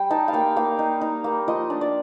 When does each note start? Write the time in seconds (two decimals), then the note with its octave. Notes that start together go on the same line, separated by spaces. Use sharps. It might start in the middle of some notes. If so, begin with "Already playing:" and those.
Already playing: G3 G5
0.10 D#4 A5
0.28 F5
0.33 A#3 G5
0.56 A#3 F5
0.79 D#4
1.01 D#4
1.24 A#3
1.48 F3 D#5
1.70 D4
1.81 D5